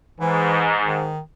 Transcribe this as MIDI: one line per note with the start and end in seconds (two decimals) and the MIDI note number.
0.20 1.12 44
0.20 0.73 52
0.84 1.20 51